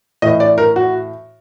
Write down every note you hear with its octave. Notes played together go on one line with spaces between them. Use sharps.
A2 E3 D#5
D5
A#4
F#4